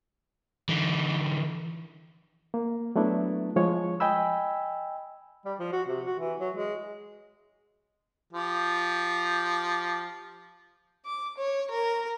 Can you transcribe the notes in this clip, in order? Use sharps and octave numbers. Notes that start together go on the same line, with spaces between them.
D3 E3
A#3
F#3 A3 B3 D4 E4
F3 G#3 C#5
D#5 G5 G#5 B5 E6
G3
F3
F#4
C3
F#4
E3
F#3
G#3
F3 G4
D6
C#5
A#4